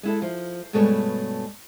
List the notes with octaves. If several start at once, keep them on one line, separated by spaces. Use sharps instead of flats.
G#3 E4 A4
F3
G2 B2 G#3 A3 A4 C#5